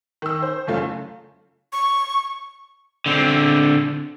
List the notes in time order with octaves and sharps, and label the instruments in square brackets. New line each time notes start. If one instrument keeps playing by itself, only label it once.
[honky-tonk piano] D#3 E6
C5
F#1 F#2 A3 F4
[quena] C#6
[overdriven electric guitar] D3 C4